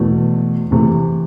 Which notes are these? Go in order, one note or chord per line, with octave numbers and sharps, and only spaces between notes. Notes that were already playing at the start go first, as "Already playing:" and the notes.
Already playing: E2 B2 A3
C3 E3 A3